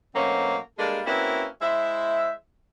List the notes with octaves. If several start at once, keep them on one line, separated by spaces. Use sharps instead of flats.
B2 F#3 A3 A#3 C4 C#4
G3 G#3 A#3 D4 A4 A#4
A#3 C4 C#4 E4 F#4 B4
G#3 E4 C5 E5